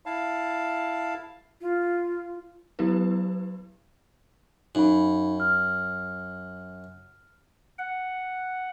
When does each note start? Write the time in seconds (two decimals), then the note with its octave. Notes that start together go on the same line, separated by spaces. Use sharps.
0.06 E4 F5 A5
1.61 F4
2.79 F#3 B3 E4 G4 B4
4.75 F#2 D#4 F5 B5
5.40 F6
7.78 F#5